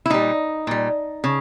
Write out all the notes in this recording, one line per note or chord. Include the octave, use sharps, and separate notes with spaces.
E4
A#2 G3 D#4
A#2 G3
C#3